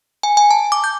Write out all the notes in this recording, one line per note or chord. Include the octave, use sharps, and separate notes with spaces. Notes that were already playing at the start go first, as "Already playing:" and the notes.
G#5
G#5
A5
D6
G6